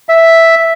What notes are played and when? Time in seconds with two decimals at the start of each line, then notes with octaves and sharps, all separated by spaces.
0.09 E5